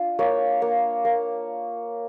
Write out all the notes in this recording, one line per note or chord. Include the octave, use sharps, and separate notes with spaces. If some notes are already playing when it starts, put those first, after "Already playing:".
Already playing: D4 F4
A#3 C#5
A#3
A#3